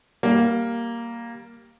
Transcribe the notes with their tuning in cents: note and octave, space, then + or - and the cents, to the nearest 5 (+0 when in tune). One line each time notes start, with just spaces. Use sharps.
G3 +0 A#3 +0